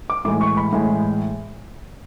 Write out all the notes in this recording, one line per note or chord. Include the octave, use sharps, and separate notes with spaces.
D6
A2 E3 G#3 D6
C#6
B5
A2 E3 G#3